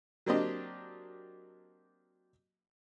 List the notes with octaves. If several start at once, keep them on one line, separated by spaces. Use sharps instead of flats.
F#3 A#3 C4 D4 G4 D#5